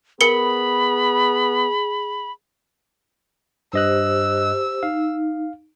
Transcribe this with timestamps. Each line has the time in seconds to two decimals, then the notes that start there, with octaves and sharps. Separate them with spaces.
0.21 B3 G#4 A#4 B5 C#7 G7
3.73 G2 G4 C5 D#5 E6 F#6
4.83 D#4 F5